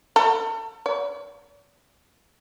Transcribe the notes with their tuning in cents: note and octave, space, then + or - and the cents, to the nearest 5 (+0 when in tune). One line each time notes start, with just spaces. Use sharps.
A4 +35
D5 -45